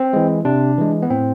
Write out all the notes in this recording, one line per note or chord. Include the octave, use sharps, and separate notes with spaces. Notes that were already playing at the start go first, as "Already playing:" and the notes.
Already playing: C4
E3 G#3
C3 D4
E3 G#3
B3
A2 C4